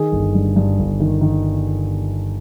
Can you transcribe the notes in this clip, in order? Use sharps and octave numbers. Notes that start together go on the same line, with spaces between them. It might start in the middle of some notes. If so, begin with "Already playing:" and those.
Already playing: D#3 G#4
G1
G2
G2
G1
D#3
D#3